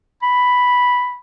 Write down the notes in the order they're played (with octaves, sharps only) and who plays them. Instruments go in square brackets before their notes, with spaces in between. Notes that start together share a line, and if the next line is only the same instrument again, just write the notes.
[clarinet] B5